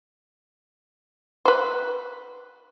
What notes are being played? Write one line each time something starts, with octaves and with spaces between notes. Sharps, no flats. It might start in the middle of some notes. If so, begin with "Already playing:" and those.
B4 C5